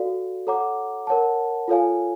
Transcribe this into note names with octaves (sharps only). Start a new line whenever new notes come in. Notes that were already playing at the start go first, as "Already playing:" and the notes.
Already playing: F#4 A4 D5 F5
A4 C#5 F#5 A#5 D6
A#4 C#5 F#5 A5
F4 A4 C#5 F5 G#5